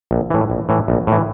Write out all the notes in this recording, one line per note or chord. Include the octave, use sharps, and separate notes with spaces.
A#1
A2 E3
A#1
A2 E3
A#1
A2 E3